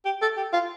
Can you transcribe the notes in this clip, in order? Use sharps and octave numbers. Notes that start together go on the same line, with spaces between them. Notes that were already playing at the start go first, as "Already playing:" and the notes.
G4
A4
G4
F4